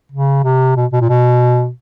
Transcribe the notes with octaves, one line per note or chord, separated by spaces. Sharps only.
C#3
C3
B2
B2
A#2
B2